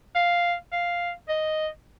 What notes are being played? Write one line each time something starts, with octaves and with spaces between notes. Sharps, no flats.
F5
F5
D#5